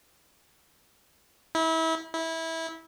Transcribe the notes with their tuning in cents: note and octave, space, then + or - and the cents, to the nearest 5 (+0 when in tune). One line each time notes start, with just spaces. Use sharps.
E4 -30
E4 -20